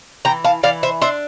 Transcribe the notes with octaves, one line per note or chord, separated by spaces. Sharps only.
E3 G5 A#5
F5 A5
E3 D5 F5
C5 E5
D4 C5 E5